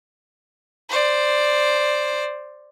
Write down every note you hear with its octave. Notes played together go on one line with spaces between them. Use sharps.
C5 D5